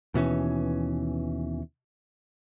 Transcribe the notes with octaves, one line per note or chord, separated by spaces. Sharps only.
D#2 B2 E3 C#4